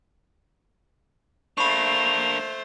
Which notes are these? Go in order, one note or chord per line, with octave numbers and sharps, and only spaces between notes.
A3 A#3 D4 C5 B5 C#6 F7